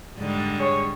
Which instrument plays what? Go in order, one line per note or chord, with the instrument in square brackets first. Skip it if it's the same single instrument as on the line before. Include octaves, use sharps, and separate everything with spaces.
[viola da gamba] G#2 D3 G3
[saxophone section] G#4 C#5